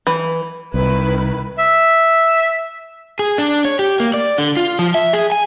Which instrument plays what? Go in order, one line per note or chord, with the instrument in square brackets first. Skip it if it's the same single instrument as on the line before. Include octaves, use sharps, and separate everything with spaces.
[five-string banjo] E3
[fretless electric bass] C2 [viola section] D#3 E4 B4
[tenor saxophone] E5
[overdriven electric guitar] G#4
D4
C#5
G4
A#3
D5
D3
F4
F3
E5
G#4
G#5